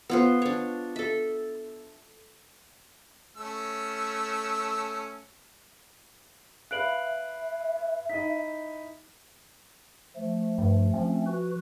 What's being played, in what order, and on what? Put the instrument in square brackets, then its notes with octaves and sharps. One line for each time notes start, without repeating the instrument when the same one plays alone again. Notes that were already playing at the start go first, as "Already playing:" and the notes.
[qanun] B3 F4 C5
D4 C#5
A4 E5
[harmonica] A3 C#4 E6
[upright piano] B4 F5 [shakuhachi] E5 [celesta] F#6 D7 F#7
[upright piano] D#4 E4 D#5 [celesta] B6
[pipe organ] F3 A3
[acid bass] G2
[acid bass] F3 [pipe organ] A3 C4 C#4
[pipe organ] F#4 B4